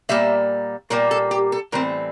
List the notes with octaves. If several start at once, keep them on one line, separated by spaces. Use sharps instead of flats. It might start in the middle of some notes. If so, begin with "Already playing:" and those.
A#2 G3 A#3 E5
A#2 G3 A#3 A#4
A4
G4
A4
A2 E3 G3 C4 A#4